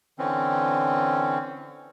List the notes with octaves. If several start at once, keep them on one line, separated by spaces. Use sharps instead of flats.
D3 E3 C4 C#4